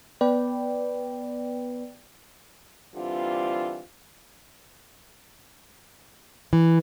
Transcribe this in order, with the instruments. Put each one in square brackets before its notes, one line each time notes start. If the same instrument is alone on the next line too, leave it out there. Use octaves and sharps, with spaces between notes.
[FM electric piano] B3 B4 D5 G5
[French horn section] D3 E3 G3 C4 F4
[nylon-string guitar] E3